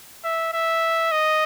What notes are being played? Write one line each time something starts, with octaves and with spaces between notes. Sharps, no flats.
E5
E5
D#5